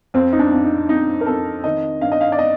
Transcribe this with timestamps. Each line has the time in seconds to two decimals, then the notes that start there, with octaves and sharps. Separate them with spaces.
0.14 F2 C4
0.33 D#4
0.39 D4
0.52 F2
0.64 D#4
0.89 F2 D#4
1.21 A#4
1.26 F2 A4
1.64 D#3 D#5
2.01 G2 F5
2.12 D#5
2.21 F5
2.32 D5
2.39 D#5